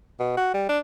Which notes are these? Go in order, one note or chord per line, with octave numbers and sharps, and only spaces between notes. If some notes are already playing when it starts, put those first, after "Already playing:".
B2
F#4
G3
D4